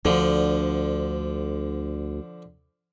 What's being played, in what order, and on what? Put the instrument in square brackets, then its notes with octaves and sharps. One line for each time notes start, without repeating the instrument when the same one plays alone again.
[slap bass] D2 [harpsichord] D3 F3